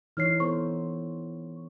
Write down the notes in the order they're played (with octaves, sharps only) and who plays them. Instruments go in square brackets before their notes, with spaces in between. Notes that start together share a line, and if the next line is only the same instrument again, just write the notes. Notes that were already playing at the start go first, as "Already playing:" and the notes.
[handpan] E3 D#4 C#5 [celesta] F6 C7
[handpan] B3 A4 C5 [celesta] C#6